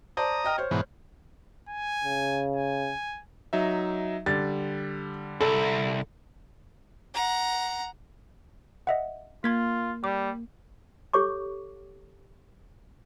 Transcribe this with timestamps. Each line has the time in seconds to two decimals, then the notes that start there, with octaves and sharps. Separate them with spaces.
0.17 C5 D5 A5 A#5 D#6
0.44 D#5 G5 F6
0.58 C5 C#5
0.71 G#2 B2 E3
1.69 G#5
2.04 C#3
2.56 G#5
3.53 F#3 D#4 E5
4.26 D3 G3 A6
5.41 C2 A4
7.14 F#5 A#5
8.87 D#5 E5 F#5
9.44 A#3 F4 C6 G#6 B6
10.04 G3 D6
11.13 G4 A4 C#5 C#6 D6